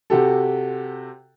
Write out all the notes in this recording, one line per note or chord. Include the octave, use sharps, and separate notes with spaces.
C3 F#4 G4 A4